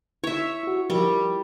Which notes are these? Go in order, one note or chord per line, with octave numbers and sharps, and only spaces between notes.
E4 C#5 E5
E4 F#4
F3 G3 E4 A#4